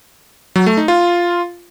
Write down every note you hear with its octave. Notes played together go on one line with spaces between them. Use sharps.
F#3
A3
D#4
F4